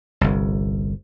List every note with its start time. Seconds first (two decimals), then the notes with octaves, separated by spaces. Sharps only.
0.21 G1 C2